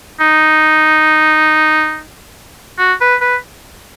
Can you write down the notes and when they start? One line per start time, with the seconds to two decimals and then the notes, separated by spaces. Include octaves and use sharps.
0.20 D#4
2.79 F#4
3.01 B4
3.21 B4